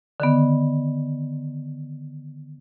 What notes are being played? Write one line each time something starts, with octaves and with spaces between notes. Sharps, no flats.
D3 D#3 B3